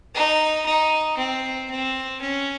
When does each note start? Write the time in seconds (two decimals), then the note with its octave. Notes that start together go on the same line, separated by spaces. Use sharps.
0.14 D#4
0.66 D#4
1.17 C4
1.70 C4
2.21 C#4